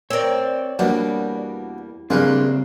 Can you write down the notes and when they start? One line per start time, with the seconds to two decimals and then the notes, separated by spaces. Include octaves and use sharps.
0.10 C4 A#4 C#5 D5
0.79 E2 B2 G3 A#3 D4
2.10 C#3 G3 G#3 A#3 C4 D4 B4